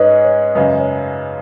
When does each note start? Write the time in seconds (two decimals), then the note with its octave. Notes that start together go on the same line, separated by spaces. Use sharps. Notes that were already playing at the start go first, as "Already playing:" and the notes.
Already playing: G#2 G#3 C#4 G#4 B4 C#5 D#5
0.24 C#5
0.55 F#2 C#3 G#3 B4
0.80 C#5